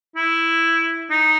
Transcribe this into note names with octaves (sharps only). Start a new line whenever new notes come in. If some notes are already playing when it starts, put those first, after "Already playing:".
E4
D#4